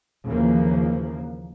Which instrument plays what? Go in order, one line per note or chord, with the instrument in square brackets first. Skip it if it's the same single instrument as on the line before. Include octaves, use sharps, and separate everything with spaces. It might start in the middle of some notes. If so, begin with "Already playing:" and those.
[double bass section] D#2 C#3 E3 F3 A#3